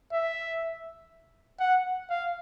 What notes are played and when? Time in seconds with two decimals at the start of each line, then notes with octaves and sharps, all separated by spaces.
0.12 E5
1.60 F#5
2.10 F5